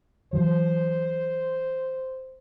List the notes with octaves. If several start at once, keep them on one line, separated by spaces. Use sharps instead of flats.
E3 F#3 C5